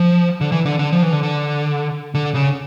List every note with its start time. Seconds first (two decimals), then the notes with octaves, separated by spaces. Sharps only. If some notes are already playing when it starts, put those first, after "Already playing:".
Already playing: F3
0.41 D3
0.52 E3
0.66 D3
0.79 D3
0.93 F3
1.02 E3
1.13 D3
1.23 D3
2.15 D3
2.34 C#3